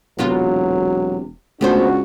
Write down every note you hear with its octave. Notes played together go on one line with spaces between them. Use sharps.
E1 C3 F#3 B3 F4
C#2 A3 B3 D4 F#4 C5